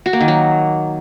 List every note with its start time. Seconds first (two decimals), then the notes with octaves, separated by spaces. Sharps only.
0.06 F#4
0.13 A#3
0.21 D#3
0.28 F#3